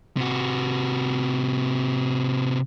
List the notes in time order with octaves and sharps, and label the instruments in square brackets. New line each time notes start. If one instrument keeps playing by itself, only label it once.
[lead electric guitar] C3 F#4